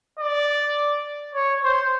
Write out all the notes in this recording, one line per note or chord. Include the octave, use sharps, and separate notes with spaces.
D5
C#5
C5